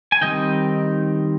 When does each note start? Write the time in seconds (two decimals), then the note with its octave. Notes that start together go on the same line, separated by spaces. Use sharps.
0.12 G#5
0.21 D#3 G3 C4 D#4 D#5 G5